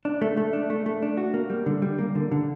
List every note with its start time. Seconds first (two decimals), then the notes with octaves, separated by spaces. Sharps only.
0.05 D4
0.22 A3
0.37 A3
0.53 D4
0.70 A3
0.86 A3
1.02 D4
1.17 F#4
1.34 A#3
1.50 G3
1.66 D3
1.82 G3
1.98 A#3
2.15 D3
2.32 D3